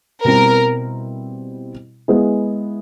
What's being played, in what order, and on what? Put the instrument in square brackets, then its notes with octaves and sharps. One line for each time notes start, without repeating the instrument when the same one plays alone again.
[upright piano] B2 G3 C4 E4 [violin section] A#4
[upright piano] G#3 B3 E4 G#4